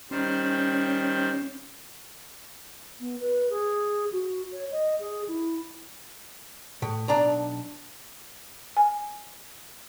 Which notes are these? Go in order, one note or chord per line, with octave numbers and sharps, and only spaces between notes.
D#3 G3 C#4 C5
B3
B4
G#4
F#4
C#5
D#5
G#4
E4
A2
B1 D4 D5 A#5
G#5